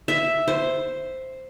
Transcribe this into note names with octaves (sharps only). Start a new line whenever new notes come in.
E5
C5